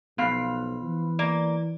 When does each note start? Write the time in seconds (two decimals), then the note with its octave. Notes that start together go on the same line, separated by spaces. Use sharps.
0.18 B1 F3 B3 F5 B5
0.83 E3
1.19 A#3 D5